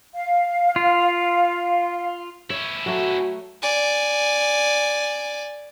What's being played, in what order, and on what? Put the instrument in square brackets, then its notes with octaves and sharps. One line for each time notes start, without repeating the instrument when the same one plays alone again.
[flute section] F5
[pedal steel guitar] F4
[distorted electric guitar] C#4 E4 [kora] C#5
[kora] F#3 A3 [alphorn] F#4
[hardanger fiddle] D5 G#5